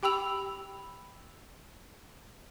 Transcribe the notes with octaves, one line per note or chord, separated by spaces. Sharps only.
G4 G5 B5 E6 F7